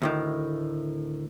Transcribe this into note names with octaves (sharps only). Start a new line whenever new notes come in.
D2 A2 D#3